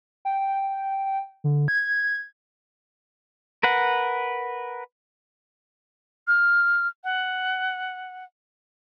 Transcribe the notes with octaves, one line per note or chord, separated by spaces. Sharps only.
G5
D3
G#6
A#4 B4 F#5
F6
F#5